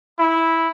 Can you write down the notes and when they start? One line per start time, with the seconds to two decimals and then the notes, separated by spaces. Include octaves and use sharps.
0.19 E4